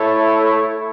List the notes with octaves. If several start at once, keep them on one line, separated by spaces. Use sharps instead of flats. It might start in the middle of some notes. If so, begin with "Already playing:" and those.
Already playing: A3 E4 A4 C#5